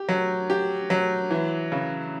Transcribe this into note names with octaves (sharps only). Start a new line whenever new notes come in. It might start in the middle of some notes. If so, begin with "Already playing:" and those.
Already playing: G4
F#3
G4
F#3
E3
C#3